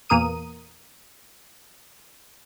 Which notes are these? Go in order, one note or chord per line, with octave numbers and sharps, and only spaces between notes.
E2 A#2 A#4 D#6 D#7